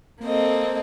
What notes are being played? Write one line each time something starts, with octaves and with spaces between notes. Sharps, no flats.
A#3 C4 A4 D#5